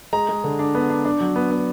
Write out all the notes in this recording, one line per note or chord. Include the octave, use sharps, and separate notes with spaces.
G#3 A#5
G#3
D3
D4
B3
D4
D4
F#3
B3
B3